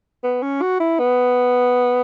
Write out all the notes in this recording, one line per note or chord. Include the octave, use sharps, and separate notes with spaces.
B3
C#4
F#4
E4
B3